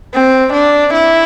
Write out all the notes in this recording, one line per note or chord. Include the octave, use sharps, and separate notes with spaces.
C4
D4
E4